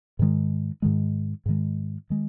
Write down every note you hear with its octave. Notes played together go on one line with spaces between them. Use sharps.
G#2 D#3 G#3
G#2 D#3 G#3
G#2 D#3 G#3
D#3 G#3